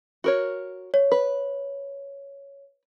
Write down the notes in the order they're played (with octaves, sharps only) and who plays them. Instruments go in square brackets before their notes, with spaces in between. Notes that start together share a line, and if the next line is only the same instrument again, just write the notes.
[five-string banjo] F#4 A#4 C#5
[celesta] C#5
[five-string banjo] B4